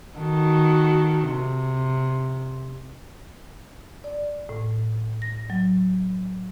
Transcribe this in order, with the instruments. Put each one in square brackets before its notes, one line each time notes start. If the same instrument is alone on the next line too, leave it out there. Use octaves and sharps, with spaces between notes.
[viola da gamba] D#3 F#4 A4
C3
[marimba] D5
A2
A#6
F#3